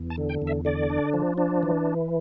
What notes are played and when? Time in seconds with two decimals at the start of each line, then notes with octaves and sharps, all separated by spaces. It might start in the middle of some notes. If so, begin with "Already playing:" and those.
Already playing: E2
0.10 A5
0.17 D3
0.29 G5
0.42 E2
0.47 E5
0.65 D3 D5
0.90 D4
1.14 F3
1.38 D4
1.63 E3